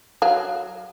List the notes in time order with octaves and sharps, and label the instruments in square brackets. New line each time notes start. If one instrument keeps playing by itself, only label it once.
[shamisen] F#3 F5